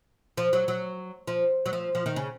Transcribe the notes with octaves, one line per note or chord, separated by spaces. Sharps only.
F3
F#3
F#3
F3
F#3
F3
F3
D#3
C#3